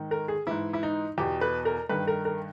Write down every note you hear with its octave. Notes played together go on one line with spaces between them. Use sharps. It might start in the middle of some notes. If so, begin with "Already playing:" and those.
Already playing: G#2 D#3
A#4
G#4
G#2 E3 E4
E4
D#4
E2 B2 G4
B4
A#4
G2 D#3 B4
A#4
A#4